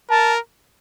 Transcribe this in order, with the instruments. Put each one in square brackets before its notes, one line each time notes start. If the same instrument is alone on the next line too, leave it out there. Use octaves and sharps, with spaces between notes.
[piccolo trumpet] A#4 [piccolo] A5